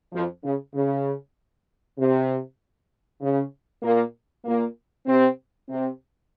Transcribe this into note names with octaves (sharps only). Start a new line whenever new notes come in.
F2 F3
C#3
C#3
C3
C#3
A#2 A#3
A#2 A#3
C3 C4
C3 C4